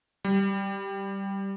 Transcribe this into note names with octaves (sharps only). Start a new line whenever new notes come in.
G3